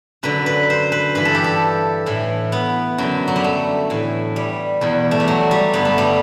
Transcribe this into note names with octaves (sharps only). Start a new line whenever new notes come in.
F#2 D3 B4
B4
C5
B4
G2 E3 B4
A4
G4
A4
A2 E3
B3
F#2 D3
F#3
G3
A3
A2 E3
G3
E2 B2
A3
G3
F#3
G3
G2 D3 B3
A3
G3